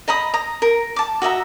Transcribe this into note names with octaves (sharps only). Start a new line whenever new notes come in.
D#5 A#5 B5 D#6
A#5 D#6
A#4
A5 D6
F#4 D#5 E5 A#5